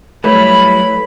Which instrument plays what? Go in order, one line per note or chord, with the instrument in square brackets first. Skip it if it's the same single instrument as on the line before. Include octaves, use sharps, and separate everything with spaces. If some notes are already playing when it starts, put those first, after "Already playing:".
[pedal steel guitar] F#3 G3 E4 [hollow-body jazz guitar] A3 [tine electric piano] B4 C#5 [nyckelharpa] B5